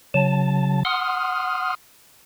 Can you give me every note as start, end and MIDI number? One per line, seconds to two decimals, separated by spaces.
0.14 0.83 49
0.14 0.83 54
0.14 0.83 81
0.85 1.75 78
0.85 1.75 84
0.85 1.75 87
0.85 1.75 89